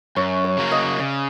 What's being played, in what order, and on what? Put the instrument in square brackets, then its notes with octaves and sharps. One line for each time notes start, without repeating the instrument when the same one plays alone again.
[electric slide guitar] F#2 [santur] C#5
[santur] C#5
[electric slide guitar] C#3 F#3 A#3
[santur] D#5
[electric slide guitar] C#3 [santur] D5